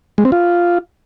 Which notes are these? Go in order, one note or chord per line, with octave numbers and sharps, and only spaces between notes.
G#3
C4
F4